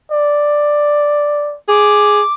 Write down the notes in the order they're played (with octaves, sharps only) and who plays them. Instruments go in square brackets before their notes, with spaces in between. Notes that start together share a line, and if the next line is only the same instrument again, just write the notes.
[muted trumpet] D5
[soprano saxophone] G#4 [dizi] D6